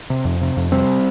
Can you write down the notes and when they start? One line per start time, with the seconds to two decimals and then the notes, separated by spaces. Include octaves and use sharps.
0.10 C3
0.25 F2
0.41 C3
0.57 F2
0.72 C3 G3 C4